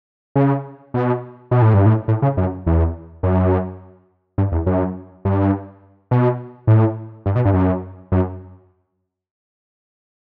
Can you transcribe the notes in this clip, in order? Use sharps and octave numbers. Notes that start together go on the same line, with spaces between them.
C#3
B2
B2
A2
G2
A2
A2
C#3
F#2
E2
F#2
G2
E2
F#2
G2
B2
A2
G2
B2
G2
F#2
F#2